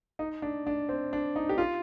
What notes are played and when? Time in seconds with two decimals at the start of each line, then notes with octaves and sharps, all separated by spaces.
0.19 D#4
0.42 D4
0.67 D4
0.89 C4
1.13 D4
1.36 D#4
1.49 G4
1.58 F4